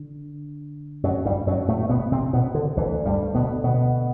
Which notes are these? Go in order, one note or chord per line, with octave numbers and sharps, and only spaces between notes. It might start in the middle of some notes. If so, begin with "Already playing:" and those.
Already playing: D3
F#2 F#3
G2 G3
F#2 F#3
A2 A3
A3
B2 B3
C3 C4
B2 B3
D3
D2 D3 E3
G2 G3
B2 B3
B2 B3